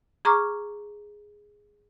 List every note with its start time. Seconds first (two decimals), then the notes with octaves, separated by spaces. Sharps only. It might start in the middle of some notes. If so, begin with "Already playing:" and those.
0.25 G#4 A#5 C#6 D6 F6